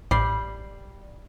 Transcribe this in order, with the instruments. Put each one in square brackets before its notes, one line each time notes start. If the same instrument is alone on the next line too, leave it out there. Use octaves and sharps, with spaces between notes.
[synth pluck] A1 C7 [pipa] G3